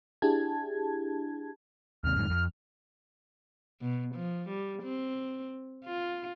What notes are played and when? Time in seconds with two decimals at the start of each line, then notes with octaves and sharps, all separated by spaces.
0.22 D4 E4 G4 G#4 A5 G#6
2.04 D#2 C3 F6
2.16 F2 G#2 D#3
2.30 F2
3.81 B2
4.15 F3
4.49 G3
4.83 C4
5.85 F4